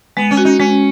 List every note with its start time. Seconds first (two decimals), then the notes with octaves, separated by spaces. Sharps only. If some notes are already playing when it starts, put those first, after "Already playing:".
0.17 G#3 B3
0.31 C#4
0.37 F#4
0.45 D#4
0.59 G#3 C#4